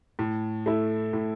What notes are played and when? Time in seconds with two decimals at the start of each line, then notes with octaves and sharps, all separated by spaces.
0.19 A2
0.66 A3 E4
1.13 A2